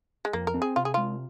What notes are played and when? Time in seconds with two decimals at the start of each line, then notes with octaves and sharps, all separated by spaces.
0.25 G#3
0.33 F2 A#3
0.47 A#4
0.54 C4
0.62 G#4
0.76 C3 F4
0.85 G#4
0.94 G#3 F4